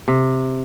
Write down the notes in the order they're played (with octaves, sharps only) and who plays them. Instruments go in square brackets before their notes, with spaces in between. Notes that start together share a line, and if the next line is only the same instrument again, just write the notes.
[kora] C3